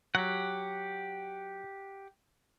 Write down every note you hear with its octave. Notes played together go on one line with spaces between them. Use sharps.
F#3 G4 F#5